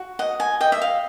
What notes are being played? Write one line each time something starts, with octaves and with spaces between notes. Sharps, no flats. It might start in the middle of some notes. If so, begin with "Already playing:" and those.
Already playing: F#4
D#5 F#5
G#5
D#5 G5
E5
F5